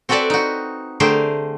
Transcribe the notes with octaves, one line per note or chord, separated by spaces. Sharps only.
C4 F#4 A4 B4 D5 E5
D#4 F#4
D3 A3 G4 G#4 A#4 C5